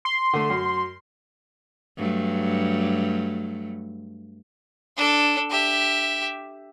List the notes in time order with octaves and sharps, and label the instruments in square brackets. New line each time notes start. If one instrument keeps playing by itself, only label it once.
[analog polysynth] C6
[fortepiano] D3 A3
F#2
[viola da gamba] G2 F#3 A3
[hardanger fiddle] D4 A4
G4 E5